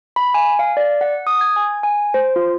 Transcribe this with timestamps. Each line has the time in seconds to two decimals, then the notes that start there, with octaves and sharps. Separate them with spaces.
0.16 B5
0.34 G#5
0.59 F5
0.77 D5
1.01 F#5
1.27 D#6
1.41 G#6
1.56 G#5
1.83 G#5
2.14 C5
2.36 F4